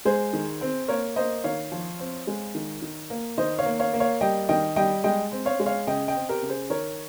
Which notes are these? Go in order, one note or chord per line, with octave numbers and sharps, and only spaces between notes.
G#3 G#4 C5
D#3
C4
A#3 A#4 C#5
A#3 C5 D#5
D#3 C#5 F5
F3
C4
G#3
D#3
D#3
A#3
D#3 C5 D#5
C#5 F5
A#3
C#5 F5
A#3
C#5 F5
G3 D#5 G5
D#3 D#5 G5
G3 D#5 G5
G#3 D#5 G5
C4
C#5 F5
G#3
C#5 F5
C#3 D#5 G5
D#5 G5
C4
G4 A#4
C#3
G#4 C5
D#3 A#4 C#5